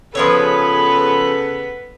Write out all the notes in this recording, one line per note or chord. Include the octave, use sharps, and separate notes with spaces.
C#3 F3 B3 G#4 A4 B4 C#5